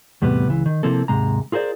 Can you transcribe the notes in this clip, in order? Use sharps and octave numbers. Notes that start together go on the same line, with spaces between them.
E2 A2 C3 G3 B3
C#2 E3
D#3
C3 F3 A#3 C4 E4 A4
D#2 G#2 C3 G#3 A#5
F4 G#4 A#4 C5 D5